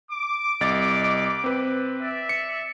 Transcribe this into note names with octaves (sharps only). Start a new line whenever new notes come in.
D6
C2 D#5 A6
C4 B4
D5 E5
C#7